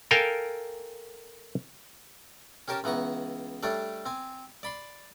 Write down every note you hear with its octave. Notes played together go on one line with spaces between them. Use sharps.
A4 A#4 F5 G5 G#5
C#4 G4 A#4 C#5 A5
C#2 E3 B3 A#5 C#6
G3 A3 D4 C#5 D5
C4 G#5
D5 B5 C6